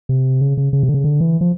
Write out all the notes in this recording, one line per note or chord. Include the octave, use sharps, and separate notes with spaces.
C3
C#3
C#3
C#3
C3
D3
C#3
D3
E3
F3